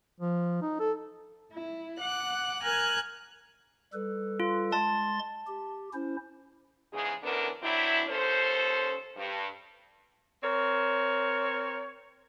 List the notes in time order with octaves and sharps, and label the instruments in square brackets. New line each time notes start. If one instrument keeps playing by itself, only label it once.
[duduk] F3
D#4
A4
[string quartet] E4
F#5 D6 F#6
A#4 G#5 F6 F#6 G#6
[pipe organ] G3 A4 B4
[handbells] F4
[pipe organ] G#3 C6 A6 [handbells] A5
[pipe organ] G4
C#4 E4 C5
[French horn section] E2 G#2 C#3 G#3 G#4
E2 D3 B3 C#4 D4 A#4
F#3 C4 D4 E4
D#2 C#4 A4 C5
G2
[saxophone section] C4 A#4 C#5